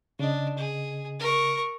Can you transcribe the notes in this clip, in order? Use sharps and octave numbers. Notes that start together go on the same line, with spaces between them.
C#3 D4 D#5
G#4
A#4 C#6